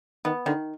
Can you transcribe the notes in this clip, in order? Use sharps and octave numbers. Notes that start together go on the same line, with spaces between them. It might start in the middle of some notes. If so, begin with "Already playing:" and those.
D#3 B3
D3 D#3